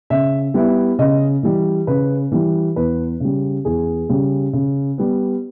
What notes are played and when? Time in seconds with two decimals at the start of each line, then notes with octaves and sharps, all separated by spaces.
0.10 C#3 E5
0.54 G3 B3 E4
0.99 C#3 D#5
1.43 E3 G3
1.87 C#3 B4
2.32 E3 G3
2.76 E2 B4
3.20 C#3 G3
3.65 E2 G#4
4.09 C#3 G3
4.53 C#3
4.98 G3 B3